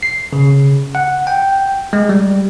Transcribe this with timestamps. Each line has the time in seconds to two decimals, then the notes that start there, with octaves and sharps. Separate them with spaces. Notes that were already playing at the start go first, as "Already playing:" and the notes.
0.03 C7
0.33 C#3
0.95 F#5
1.27 G5
1.93 G#3
2.09 G3